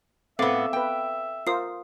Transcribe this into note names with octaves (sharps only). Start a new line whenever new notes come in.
A2 B3 C4 A4 E5 F5 D6
B3 B4 G5
F4 A#4 C5 D#6 C7